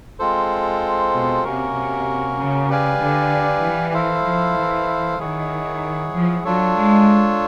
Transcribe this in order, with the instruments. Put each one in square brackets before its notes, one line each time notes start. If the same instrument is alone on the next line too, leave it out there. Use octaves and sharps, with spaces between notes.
[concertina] G#3 C4 F4 A4 C5
[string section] B2
[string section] C3 [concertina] A#3 C#4 F#4 A#4
[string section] C3
C#3
[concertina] G4 B4 D5 F5 G#5
[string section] D3
E3
[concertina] E4 A4 C5 F5
[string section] F3
E3
[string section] D#3 [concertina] E4 G#4 C#5 F#5
[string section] F3
[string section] F#3 [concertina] D4 F4 A4 C#5
[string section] G#3